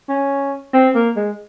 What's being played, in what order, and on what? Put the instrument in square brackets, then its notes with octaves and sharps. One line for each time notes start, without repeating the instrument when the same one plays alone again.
[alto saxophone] C#4
C4
A#3
G#3